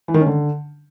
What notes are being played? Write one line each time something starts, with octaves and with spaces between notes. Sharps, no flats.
E3
D#3
C#4
D3